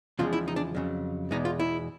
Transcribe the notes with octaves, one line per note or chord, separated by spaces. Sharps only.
E2 C#3 F3 G#3 F4
E4
D#4
D4
F2 C#3 F#3
E2 B2 G#3 D#4
F4
E4